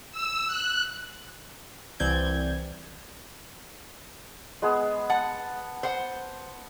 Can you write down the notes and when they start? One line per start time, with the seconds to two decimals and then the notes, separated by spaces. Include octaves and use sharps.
0.12 E6
0.47 F#6
2.00 C2 E3 C4 D5 G6 G#6
4.62 G#3 B3 G#4
5.10 F#5 A5
5.83 C5 F#5